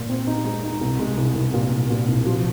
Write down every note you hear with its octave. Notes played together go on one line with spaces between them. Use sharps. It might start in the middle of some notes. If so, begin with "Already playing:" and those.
Already playing: A#2
C4
D#4
G#3
D#4
C2
G#3
C2
C2
A#2
C2
A#2
C2
F3